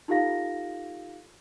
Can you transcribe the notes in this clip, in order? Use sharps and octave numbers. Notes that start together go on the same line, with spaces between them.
D#4 F4 G4 A4 F5 A#6